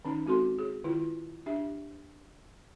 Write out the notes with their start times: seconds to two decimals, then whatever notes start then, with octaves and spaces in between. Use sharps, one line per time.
0.05 D#3 C#4 D#4
0.25 G#3 C4 F#4 A4 C6
0.59 G#4
0.84 D#3 E4 F4
1.46 D4 G4 E5